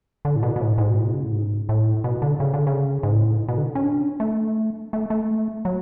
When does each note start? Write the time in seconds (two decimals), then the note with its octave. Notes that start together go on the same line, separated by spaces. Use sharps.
0.25 D3
0.36 A2
0.43 B2
0.56 B2
0.61 A2
0.78 G#2
0.90 B2
0.97 A2
1.06 B2
1.14 C#3
1.23 A2
1.32 G#2
1.69 A2
2.04 B2
2.22 D3
2.40 C#3
2.54 D3
2.67 C#3
3.03 G#2
3.12 A2
3.48 B2
3.57 D3
3.75 C#4
3.84 D4
4.20 A3
4.93 A3
5.10 A3
5.65 F#3